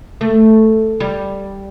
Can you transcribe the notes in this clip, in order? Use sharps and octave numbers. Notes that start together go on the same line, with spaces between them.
A3
G3